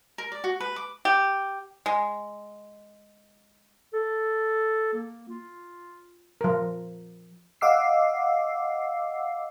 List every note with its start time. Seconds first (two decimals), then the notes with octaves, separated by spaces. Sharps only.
0.18 A#4
0.32 D5
0.44 F#4
0.60 B4
0.76 D6
1.05 G4
1.86 G#3
3.93 A4
4.93 A#3
5.29 F4
6.41 F3 A#4
7.61 D#5 F5 F#5 D6 E6 C7